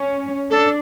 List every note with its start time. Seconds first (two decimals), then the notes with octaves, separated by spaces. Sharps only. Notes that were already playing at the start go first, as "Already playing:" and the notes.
Already playing: C#4
0.50 D4 A4